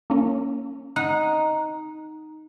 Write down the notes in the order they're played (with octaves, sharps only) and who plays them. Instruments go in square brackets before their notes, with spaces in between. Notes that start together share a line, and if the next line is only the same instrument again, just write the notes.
[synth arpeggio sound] A#3 C#4
[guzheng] D#4 [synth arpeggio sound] F#5